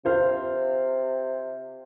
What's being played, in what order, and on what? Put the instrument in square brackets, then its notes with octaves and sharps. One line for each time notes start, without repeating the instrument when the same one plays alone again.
[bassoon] C3 [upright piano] F4 C5 F5